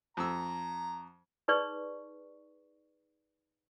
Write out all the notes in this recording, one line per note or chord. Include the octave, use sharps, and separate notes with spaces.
F2 A#5 E6
D#4 G#4 B4 D5 C#6